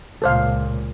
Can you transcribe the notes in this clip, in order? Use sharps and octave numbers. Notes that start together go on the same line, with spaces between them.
C#2 A#2 A4 C5 F5